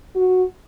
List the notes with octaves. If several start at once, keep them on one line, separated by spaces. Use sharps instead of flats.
F#4